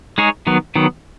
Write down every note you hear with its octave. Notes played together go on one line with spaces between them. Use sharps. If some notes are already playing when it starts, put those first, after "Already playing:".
G#3 D#4 G#4 C#5
D#3 F#3 B3
D#3 F#3 B3